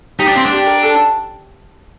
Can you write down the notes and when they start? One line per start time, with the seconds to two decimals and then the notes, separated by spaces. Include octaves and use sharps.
0.19 D#4 G4
0.28 D4
0.35 C4 F4
0.46 D4
0.51 G4
0.66 A#4
0.83 A4